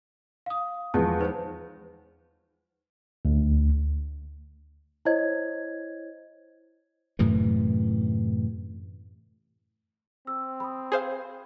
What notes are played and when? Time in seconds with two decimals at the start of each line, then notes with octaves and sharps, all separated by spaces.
0.46 F5 D#6
0.94 E2 F3 G#3 A5
1.19 D#4 B4 C5
3.25 D2
5.05 E4 C5 C#5 D#5 G#6
7.19 F#2 A2 C3 E3
10.27 C4 E6
10.60 B5 D#6
10.92 G#4 C5 F5